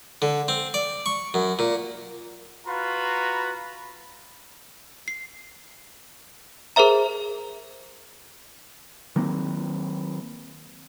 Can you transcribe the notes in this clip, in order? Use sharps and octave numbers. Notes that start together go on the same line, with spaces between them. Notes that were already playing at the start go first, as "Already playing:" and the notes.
D3
C4
D5
C#6
F#2
A#2
F4 F#4 B4 A#5 B5
C7
G#4 A#4 C5 E5 A#5
D#3 F#3 A#3 C4